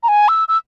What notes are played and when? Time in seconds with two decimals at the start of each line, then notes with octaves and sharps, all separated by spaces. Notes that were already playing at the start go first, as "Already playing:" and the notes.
0.03 A#5
0.08 G#5
0.28 E6
0.48 E6